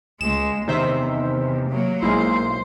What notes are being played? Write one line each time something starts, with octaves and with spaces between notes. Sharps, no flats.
C#2 G#3 E7
E2 C3 D#3 C5 E5
F#3 A#3
B1 G#3 A#3 E4 C5